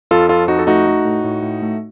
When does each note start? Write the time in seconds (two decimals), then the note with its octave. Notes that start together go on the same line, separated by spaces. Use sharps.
0.11 F2 F4 A4
0.29 F3 F4 A4
0.48 F2 D#4 F#4
0.59 A4
0.67 A3 D#4 F#4
0.87 A3
1.05 A2
1.24 A2
1.42 A2
1.62 A3